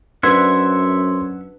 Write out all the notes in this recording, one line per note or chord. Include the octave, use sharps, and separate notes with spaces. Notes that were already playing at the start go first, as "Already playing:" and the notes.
F#2 D4 B4 C5 E5 F#5 C6 G#6